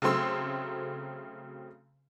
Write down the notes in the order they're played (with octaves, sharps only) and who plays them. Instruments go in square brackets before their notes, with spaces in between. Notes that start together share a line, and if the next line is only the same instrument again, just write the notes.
[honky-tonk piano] C#3 F#3 A3 C4 C6 E6